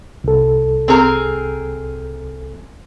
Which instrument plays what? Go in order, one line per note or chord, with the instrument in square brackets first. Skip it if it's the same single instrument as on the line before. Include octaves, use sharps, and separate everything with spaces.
[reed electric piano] C2 A4
[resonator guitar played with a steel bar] C4 G#4 A#4